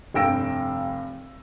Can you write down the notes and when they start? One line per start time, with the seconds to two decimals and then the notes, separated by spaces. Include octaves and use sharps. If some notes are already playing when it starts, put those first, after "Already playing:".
0.14 F1 G2 G5 E6 A#6 D7